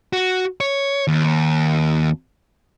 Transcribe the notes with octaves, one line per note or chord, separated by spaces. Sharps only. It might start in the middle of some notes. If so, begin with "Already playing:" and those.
F#4
C#5
D#2